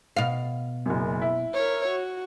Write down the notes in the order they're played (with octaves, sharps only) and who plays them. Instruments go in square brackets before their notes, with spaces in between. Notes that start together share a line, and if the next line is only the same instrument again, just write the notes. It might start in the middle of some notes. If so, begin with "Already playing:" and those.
[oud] B2 F5
[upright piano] F#1 F#2
E4
[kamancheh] A#4 C#5
F#4